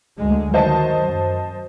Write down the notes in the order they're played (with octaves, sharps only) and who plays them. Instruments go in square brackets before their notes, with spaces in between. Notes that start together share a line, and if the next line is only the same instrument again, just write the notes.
[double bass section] D2 D3 G#3
[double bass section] D#3 F#3 [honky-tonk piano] C5 D#5 A5
[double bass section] F#2